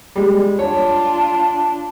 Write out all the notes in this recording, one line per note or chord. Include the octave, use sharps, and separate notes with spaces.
G3 G#3
D4 F4 C#5 A5